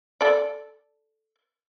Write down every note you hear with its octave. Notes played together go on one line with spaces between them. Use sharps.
A4 D5